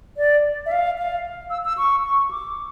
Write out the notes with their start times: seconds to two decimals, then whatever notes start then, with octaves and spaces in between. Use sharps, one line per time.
0.17 D5
0.66 E5
0.72 F5
0.98 F5
1.50 E6
1.65 E6
1.77 C#6
2.04 C#6
2.31 D6